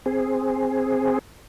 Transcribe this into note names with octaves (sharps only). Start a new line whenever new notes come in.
C4 G#4